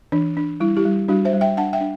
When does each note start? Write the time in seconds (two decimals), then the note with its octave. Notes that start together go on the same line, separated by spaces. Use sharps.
0.12 E3 D4
0.37 D4
0.60 G3 E4
0.77 E4 G4
0.85 G3
1.08 G3 D4 F#4
1.25 C5 E5
1.33 G3
1.41 E5 G5
1.57 D4 F#5 A5
1.73 E5 G5
1.81 D4